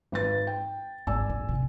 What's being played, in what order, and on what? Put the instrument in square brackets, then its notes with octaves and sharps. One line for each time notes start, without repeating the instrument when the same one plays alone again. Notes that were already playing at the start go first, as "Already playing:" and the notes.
[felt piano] G#1 B4 A6
G5
[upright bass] G#1 [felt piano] D5 G#5 E6
[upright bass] G#2
C3